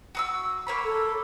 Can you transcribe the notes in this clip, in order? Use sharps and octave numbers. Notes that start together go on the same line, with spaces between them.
F#4 D#6 E6
A#3 C#5 B5
A4